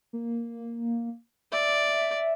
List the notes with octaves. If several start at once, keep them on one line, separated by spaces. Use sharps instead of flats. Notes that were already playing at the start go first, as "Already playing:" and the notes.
A#3
D5 E5